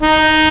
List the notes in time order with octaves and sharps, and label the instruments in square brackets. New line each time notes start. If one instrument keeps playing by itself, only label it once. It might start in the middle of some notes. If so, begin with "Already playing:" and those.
[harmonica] D#4